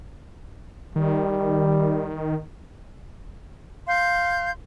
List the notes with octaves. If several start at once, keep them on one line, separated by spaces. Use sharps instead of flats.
D#3 G3
F5 C6 G6